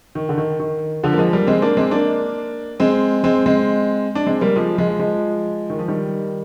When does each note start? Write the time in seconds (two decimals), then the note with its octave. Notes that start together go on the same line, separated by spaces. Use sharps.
0.15 D#3
0.29 D3
0.38 D#3
0.60 D#3
1.03 D3 F3
1.13 A#3
1.18 F3 G#3
1.33 G3 A#3
1.47 G#3 C4
1.62 A#3 D4
1.77 G#3 C4
1.91 A#3 D4
2.80 G#3 C4
3.24 G#3 C4
3.46 G#3 C4
4.15 D4
4.27 G#3 C4
4.41 G3 A#3
4.56 F3 G#3
4.78 F3 G#3
4.99 F3 G#3
5.70 D#3
5.79 F3
5.88 D#3 G3